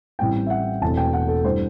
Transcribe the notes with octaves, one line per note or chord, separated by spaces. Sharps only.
A1 A2 G3 C4 G5
E5
F#5
E1 E2 B2 A3 C4 A5
G5
F#5
A4
G2 E3 G3 C5